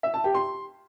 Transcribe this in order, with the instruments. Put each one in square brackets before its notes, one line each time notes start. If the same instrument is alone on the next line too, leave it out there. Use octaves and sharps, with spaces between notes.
[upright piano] E5
A5
G4
C6